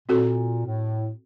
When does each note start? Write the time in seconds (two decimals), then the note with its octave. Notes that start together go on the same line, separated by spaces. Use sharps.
0.09 A#2 C4 F#4 A4
0.66 A2